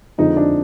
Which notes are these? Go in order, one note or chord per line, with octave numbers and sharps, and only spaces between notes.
F2 D3 F3 G#3 D#4
D4